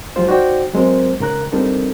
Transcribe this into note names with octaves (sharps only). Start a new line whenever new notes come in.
F3 F#3 G#3 F4 G4 C5
D#4 F#4 C5 D5 G5
F#3 G#3 C4 A#4 C5
G#2 C#3 A#4 A#5 F#6
G3 C4 D4 D#4 A4 A#4